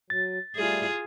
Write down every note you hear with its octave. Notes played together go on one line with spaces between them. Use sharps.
F#3 A6
G3 A3 F4 G#4